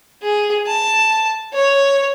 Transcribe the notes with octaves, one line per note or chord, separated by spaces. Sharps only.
G#4
A5
C#5